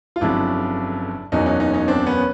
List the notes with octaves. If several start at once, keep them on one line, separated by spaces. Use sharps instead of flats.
F4
G1 F2 C#3 F#3 D4 E4
F#1 E2 B2 F#3 C#4 D#4
C#4 D#4
C#4 D#4
C#4 D#4
C4 D4
B3 C#4